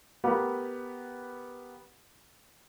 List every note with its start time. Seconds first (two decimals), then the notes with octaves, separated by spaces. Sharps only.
0.24 B3 G4 A#4 B4